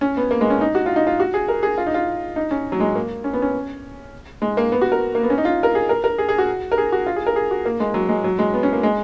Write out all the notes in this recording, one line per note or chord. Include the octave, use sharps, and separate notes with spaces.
C#4
B3
A#3
G#3
C#4
D#4
F#4
F4
D#4
F4
F#4
G#4
A#4
G#4
F4
D#4
F4
D#4
C#4
F#3
G#3
A#3
C#4
B3
C#4
G#3
A#3
B3
F#4
A#4
A#3
B3
C#4
D#4
F4
A#4
G#4
A#4
A#4
G#4
G#4
F#4
A#4
G#4
F#4
F4
G#4
A#4
G#4
F#4
A#3
G#3
F#3
G#3
F#3
G#3
B3
C#4
A#3
G#3